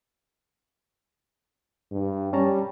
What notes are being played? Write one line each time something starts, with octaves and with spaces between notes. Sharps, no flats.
G2
G3 C#4 A5 A#5